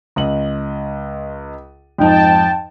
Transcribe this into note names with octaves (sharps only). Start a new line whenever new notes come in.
C#2 D#5 F#7
F2 G#2 D#4 G5 A5